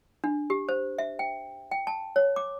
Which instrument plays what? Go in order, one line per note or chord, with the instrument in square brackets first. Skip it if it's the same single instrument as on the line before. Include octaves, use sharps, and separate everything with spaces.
[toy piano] D4
G4
C5
E5
G5
G5
A5
C#5
D6